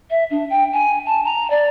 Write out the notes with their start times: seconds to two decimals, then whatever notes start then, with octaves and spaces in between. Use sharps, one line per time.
0.10 E5
0.31 D4
0.50 G5
0.73 G#5
1.06 A5
1.24 A#5
1.50 D5